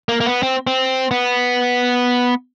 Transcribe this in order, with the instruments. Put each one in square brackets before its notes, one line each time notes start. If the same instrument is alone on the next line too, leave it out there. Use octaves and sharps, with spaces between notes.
[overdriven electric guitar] A#3
A#3
B3
C4
C4
B3